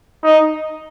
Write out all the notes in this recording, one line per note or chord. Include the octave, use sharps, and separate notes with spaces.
D#4